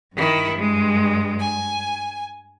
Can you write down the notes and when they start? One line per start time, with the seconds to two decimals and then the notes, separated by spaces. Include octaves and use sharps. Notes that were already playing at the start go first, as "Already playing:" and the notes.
0.16 G2 D#3 E4
0.59 G#3
1.40 G#5